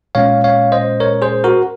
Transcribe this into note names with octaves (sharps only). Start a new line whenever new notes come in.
A#2 G#3 C#4 C#5 F5
C#5 F5
C5 D#5
A#4 C#5
G#4 C5
F#4 A#4